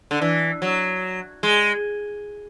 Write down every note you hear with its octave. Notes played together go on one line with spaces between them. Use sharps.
D3
E3
F#3
G#3